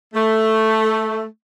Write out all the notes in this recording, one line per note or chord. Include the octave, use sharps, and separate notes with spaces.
A3